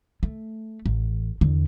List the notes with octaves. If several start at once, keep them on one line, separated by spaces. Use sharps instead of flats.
A3
A1
E2 D3